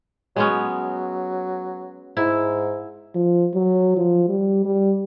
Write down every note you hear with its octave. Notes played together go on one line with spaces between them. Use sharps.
F#3 G#3 B3 C#4
G#2 E4
F3
F#3
F3
G3
G3